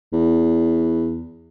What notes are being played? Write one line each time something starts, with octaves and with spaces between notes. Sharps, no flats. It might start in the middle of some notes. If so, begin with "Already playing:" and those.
E2